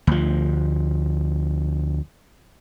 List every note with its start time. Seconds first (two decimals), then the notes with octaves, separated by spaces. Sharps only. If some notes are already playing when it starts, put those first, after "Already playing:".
0.07 D2 F3